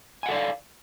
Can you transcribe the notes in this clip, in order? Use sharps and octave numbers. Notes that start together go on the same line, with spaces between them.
A4 D5 F5 F#5 G#5